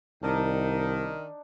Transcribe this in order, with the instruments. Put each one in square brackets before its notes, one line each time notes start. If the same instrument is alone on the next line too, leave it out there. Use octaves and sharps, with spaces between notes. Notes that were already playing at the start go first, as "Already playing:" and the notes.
[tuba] C2 [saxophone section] D#3 [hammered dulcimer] D4 D#4